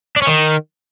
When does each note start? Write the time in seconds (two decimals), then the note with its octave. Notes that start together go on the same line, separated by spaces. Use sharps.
0.16 D4
0.22 C#4
0.27 D#3